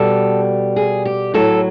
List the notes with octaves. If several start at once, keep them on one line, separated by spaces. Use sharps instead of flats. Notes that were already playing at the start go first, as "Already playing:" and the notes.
Already playing: B2 G3 A4
G#4
G4
A2 F#3 A4